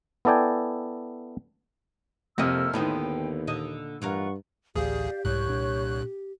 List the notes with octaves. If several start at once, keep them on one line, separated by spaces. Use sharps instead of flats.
B3 E4 A4 D5 G5 G#5
F2 C3 A#3 E4 A4 D#5 E6 F6
D#2 A2 D3 D#3 B3 C5 G5
A#2 D3 A4 D#5
G2 E3 F4 A#4 F#5 C#6
A1 D2 G4 G#4 D5 F5 G6
C2 G#2 C#5 C#6 F#6 G6
A#2 D4